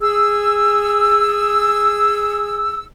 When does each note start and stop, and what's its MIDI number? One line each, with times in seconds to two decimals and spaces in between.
0.02 2.84 68
0.02 2.84 88